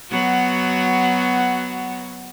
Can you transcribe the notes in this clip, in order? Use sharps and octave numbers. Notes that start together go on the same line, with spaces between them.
F#3 B3 F#4